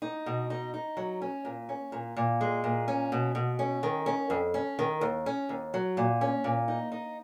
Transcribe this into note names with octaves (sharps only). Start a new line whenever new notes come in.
D#4
B2
D#4
D#4
F#3
C#4
A#2
C#4
A#2
A#2
G#3
A#2
C#4
B2
B2
C#4
D#3
C#4
F2
C#4
D#3
D#2
C#4
D#2
F#3
A#2
C#4
A#2
D#4
D#4